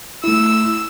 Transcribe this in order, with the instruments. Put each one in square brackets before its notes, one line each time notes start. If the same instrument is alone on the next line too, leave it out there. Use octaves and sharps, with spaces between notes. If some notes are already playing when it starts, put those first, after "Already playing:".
[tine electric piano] A3 E4 [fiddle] E6